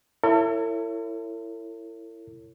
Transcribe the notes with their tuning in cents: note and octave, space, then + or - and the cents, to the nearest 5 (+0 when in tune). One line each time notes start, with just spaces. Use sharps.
E4 +20 A4 +45 C#5 +0